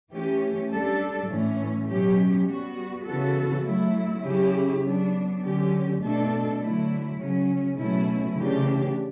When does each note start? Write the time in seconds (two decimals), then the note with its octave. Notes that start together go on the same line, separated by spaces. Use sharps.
0.11 E3 A3 C#4 G4
0.70 G3 D4 A4
1.29 A2 E3 A3 C#4
1.88 B2 F#3 C#4 G4
2.46 G3 B3 F#4
3.06 C#3 E3 B3 F#4 A4
3.65 F#3 A3 E4
4.24 C#3 F#3 C#4 E4 G4
4.82 F#3 B3 D4
5.42 D3 F#3 C#4 G4
6.00 B2 A3 D4 A4
6.60 D3 F#3 A3 E4
7.18 C#3 F#3 C#4
7.78 B2 F#3 A3 C#4 E4
8.36 C#3 E3 A3 D4 G4